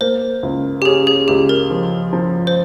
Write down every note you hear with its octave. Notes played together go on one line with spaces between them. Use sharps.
A#3 C5
C#2
G4
C#4 G#4
G#4
C#2 G4
A#4
F3
F3
C5